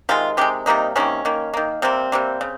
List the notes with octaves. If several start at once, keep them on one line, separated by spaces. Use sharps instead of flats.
C3 D#3 G#3 F4
C3 D#3 G#3 G4
C3 D#3 G3 A#3 D#4
C3 D#3 G3 A#3 C#4
D#3 A#3
D#3 A#3
C3 G3 A#3 C4
C3 G3 A#3
C#3